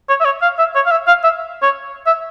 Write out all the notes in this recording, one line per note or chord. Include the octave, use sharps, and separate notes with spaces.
C#5
E5
C#5
F5
E5
C#5
F5
E5
F5
E5
C#5
E5